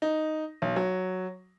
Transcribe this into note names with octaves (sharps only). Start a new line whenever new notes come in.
D#4
B1
F#3